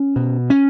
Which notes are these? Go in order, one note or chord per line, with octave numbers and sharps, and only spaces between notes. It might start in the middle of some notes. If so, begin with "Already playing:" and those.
Already playing: C#4
B2
C#4